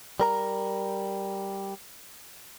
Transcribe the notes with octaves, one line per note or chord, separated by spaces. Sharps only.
G3 A#4 A#5